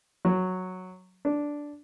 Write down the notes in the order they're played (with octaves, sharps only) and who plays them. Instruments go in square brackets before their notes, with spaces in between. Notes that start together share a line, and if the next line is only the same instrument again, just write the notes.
[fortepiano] F#3
D4